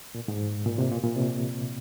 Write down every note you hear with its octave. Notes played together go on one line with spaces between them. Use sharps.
A#2
G#2
A#2
C3
A#2
A#2
C3